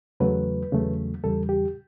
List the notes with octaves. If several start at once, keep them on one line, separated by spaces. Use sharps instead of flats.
E2 C#3 F#3 A3 B4
E2 C#3 F#3 A3
E2 C#3 G3 A4
G4